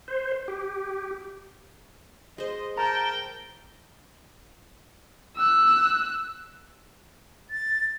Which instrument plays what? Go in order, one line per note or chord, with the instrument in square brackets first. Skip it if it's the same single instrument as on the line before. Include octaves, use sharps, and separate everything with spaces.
[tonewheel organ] C5
G4
[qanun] G#3 C5 [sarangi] D#5
[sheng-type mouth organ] A#4 A5 [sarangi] G5 [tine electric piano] A#5
[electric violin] E6 F#6
[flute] A6